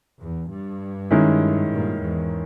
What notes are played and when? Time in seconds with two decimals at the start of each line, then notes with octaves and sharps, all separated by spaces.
0.20 E2
0.50 G2
1.11 D#3 G#3 C#4 E4
1.70 G2 A#2
2.00 E2 G#2